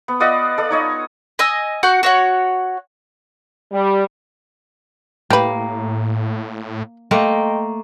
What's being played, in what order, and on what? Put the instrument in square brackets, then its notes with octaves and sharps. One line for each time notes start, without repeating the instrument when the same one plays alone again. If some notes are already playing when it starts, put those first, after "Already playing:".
[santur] B3
F4 D5 D#5 F#5
A4 D5
D#4 C#5 D#5
[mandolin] D#5 G#5 E6
F#4 F#5 G6
F#4 C#5 F#5
[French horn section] G3
[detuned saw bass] A2 [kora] A#3 [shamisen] G4 B4
[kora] A3 A#3 [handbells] D#5 G5 C6